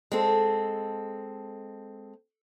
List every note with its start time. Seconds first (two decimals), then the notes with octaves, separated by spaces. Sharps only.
0.12 G#3 C4 A4